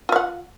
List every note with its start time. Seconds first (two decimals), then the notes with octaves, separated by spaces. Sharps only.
0.09 F4
0.12 F5
0.16 F#5